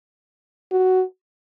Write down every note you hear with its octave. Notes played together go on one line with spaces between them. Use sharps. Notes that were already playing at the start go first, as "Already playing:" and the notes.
F#4